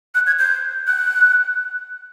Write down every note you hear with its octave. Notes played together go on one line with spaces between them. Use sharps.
F#6
G#6
G6
F#6